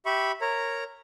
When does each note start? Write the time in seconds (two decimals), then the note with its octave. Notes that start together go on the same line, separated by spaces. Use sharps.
0.06 G4 E5 B5 C#6
0.41 A#4 C#5 A#5